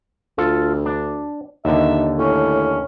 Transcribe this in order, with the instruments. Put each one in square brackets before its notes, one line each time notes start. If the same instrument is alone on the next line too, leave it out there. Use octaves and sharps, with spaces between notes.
[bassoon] D2 [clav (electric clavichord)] F4 A4
[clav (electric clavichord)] D4
[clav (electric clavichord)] D#2 D3 [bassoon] D#4 [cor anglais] E5
[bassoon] A2 [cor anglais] C#4